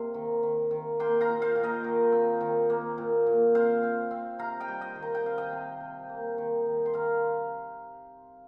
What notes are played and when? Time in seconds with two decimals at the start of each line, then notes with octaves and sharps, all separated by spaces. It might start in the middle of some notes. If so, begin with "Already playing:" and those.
Already playing: C3 A#3 F5 C6
0.14 D#3
0.43 D#3
0.71 D#3
1.00 A#3 G5 C6
1.21 F5 A#5
1.28 A#2
1.42 C5 F5
1.56 A#2
1.63 A#4 D#5
1.84 D#3
2.12 C4
2.41 D#3
2.70 A#3
2.98 A#2
3.27 A#2
3.55 C4 C5 F5
3.83 C4
4.11 C4
4.39 C3 F5 A#5
4.60 D#5 G5
4.68 G3
4.81 D#5 G5
4.96 D#3
5.02 A#5
5.15 G5
5.24 C4 F5
5.38 D#5 G5
5.53 C3
5.81 C3
6.09 A#3
6.38 D#3
6.66 D#3
6.86 C6
6.94 D#3 F5 A#5